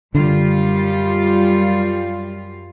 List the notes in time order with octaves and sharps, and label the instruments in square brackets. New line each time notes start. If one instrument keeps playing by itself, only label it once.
[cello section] F#2 G3 F4 [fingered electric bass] D3